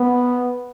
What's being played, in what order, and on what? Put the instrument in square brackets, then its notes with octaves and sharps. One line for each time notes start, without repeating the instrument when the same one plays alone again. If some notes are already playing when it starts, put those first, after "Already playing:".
Already playing: [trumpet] B3